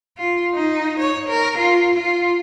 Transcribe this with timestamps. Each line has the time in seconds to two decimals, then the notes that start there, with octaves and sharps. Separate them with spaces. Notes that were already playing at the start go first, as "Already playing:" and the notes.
0.17 F4
0.55 D#4
1.00 C#5
1.29 A#4
1.58 F4
1.95 F4